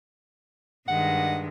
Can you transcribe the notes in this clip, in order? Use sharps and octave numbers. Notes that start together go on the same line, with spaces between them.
G2 D#3 G#3 F#5